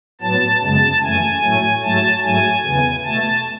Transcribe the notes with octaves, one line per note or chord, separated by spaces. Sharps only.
A2 F#3 B3 A5
F#2 C#3 G#3 B3 A5
F#2 E3 A3 G#5
A2 F#3 A3
G#2 F#3 A3 A5
G#2 F#3 A3 G#5
E2 C#3 E3 B3
B2 A3 A5